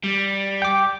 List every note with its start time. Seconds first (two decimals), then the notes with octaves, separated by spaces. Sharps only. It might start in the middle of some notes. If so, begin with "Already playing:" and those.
0.04 G3
0.62 G5 D6